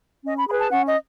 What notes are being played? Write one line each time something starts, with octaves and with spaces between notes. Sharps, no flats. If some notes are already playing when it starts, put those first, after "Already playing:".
C#4 D#5
B5
G#4 B4 B5
A5
C#4 F#5
D#5